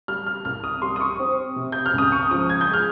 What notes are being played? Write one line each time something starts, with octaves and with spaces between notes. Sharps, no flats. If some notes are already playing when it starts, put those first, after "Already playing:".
G3 F6
F6
C2 F6
D#6
G3 C6
D#6
C#6
C4
C3
G6
F6
C#2 D#6
C#6
F3 D#6
G#6
G6
G#3
F6